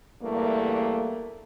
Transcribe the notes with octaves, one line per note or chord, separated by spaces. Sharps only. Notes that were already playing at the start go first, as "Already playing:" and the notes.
E2 G2 A3 A#3